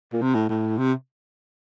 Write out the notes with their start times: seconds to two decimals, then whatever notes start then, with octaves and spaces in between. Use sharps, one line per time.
0.13 A#2
0.22 C3
0.35 A2
0.49 A2
0.78 C3